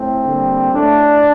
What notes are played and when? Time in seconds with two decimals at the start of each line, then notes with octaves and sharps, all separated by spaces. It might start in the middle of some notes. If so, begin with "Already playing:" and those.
Already playing: A2 A3 C4
0.26 D3 G3 A#3
0.72 A2 A3 D4